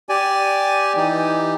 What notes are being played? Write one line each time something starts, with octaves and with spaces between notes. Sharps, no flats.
G4 D5 G#5
E3 D#4 G4